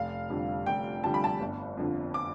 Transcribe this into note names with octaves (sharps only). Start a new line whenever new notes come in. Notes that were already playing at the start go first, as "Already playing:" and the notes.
Already playing: F1 F5
F2 D3 G3
F1 G5
F2 D3 G3 A5
B5
A5
G1
F2 D3 F3
D6